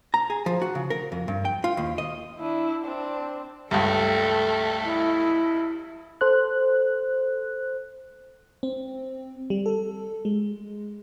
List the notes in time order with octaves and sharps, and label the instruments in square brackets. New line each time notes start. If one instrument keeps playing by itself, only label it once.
[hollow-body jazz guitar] A#5
G#4
F3
F#4
C#3
A#4
F2
G2
G5
F4
D#2
D#5
[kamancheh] D4 E4
C4 D4
[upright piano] C#2 G2 [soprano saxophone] A3 [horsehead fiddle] A4 G5
[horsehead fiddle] E4 D#5
[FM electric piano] A4 C5 F#6
C4
G3
A4
G#3